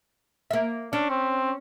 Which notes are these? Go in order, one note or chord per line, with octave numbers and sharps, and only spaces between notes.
A#3 E5
C#4 D4
C4